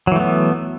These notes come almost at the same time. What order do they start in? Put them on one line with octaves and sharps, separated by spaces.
F#3 E3 A3 B3